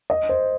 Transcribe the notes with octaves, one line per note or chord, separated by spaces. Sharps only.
D#5
C5